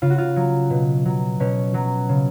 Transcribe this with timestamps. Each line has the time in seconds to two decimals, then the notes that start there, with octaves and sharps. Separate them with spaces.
0.02 C#3 F4
0.10 F#4
0.18 F4
0.36 F#3
0.70 B2
1.05 F#3
1.40 B2 C#4
1.74 F#3
2.09 C#3